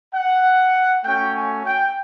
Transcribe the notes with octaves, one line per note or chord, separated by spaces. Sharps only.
F#5
A3 C#4 F#4 G5
G#5
G5